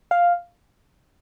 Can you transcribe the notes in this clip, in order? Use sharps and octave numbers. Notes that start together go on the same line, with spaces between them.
F5